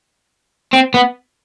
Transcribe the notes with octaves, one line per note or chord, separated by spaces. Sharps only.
C4
B3